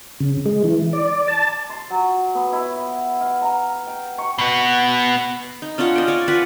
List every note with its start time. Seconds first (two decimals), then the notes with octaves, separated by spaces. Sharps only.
0.20 C#3
0.46 G#3
0.64 E3
0.93 D5
1.28 A5
1.70 C6
1.90 F#3
2.35 B3
2.53 E4
3.21 F5
3.42 A#5
3.87 G5
4.18 C#6
4.38 B2 B3
5.62 D#4
5.78 C#4 D4 F4 F#5
5.96 D#5 G5
6.07 C#5 D5 G#5
6.28 F4 B4 F#5 G#5